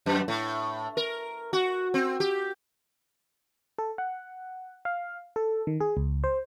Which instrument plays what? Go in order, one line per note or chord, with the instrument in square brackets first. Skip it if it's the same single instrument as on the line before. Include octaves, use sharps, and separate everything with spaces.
[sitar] F#2
A2
A#4
F#4
C4
G4
[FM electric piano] A4
F#5
F5
A4
D#3
G#4
C#2
C5